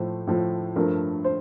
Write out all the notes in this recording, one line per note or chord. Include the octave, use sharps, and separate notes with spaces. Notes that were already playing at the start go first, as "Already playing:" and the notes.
Already playing: A2 F3 A3 C5
A2 F3 A3
G2 F3 A3 A#4
C5